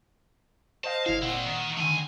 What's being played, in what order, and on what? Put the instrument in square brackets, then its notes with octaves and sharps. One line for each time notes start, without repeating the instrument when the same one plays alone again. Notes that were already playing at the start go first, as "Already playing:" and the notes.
[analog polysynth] C5 D#5 F5 [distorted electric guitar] A5
[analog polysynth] G1 E4 [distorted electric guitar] F5
[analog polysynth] A#2 F#5 E7 [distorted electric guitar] C4 E4
[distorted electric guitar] D#3
[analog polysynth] D3 D#3 [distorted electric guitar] A3 G#5